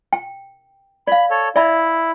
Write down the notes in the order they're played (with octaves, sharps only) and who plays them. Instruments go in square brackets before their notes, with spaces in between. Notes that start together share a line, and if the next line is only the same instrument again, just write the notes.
[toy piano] G5
[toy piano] D5 F5 [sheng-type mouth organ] B5
[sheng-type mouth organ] A4 C#5
[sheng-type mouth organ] E4 [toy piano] D5 E5 B5